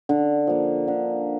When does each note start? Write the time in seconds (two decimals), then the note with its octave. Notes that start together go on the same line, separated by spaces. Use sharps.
0.09 D3
0.47 F3 A#3
0.88 D3